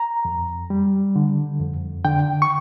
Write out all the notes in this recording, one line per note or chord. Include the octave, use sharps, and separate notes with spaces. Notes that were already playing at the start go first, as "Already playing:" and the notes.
Already playing: A#5
F2
G3
D3
F2
D3 G5
C#6